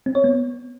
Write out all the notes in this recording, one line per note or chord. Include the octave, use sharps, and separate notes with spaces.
C4
C#5
B3